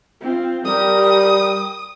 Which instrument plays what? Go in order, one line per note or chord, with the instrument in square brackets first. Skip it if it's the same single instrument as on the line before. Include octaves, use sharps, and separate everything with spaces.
[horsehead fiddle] C4 F4
[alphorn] G3 [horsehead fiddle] G4 A#4 [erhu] D#6